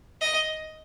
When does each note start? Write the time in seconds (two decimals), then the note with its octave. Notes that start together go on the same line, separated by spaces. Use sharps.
0.21 D#5